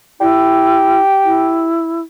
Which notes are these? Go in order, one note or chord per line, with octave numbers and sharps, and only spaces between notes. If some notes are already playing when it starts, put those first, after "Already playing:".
E4 G4
E4